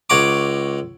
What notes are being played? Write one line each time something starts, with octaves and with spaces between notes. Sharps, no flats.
C#2 C#5 F#5 A#5 D6